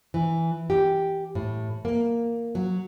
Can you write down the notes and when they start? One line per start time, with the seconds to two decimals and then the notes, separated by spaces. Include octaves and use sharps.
0.14 E3
0.70 G4
1.35 A2
1.85 A#3
2.55 F#3